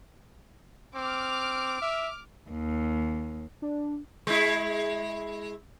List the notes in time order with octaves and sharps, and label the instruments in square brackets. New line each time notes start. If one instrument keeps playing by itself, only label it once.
[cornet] C4 [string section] D6 F6
[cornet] E5
[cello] D#2
[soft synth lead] D4
[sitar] G#3 E4